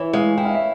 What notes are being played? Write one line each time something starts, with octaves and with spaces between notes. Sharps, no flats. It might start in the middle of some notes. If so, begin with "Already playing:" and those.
Already playing: E3 C#5 E5
G#3 F5
E4 G5
F5
E5